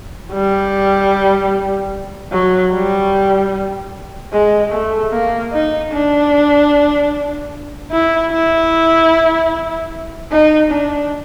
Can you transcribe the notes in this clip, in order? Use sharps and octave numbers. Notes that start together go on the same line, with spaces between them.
G3
F#3
G3
G#3
A3
A#3
D#4
D4
E4
E4
D#4
D4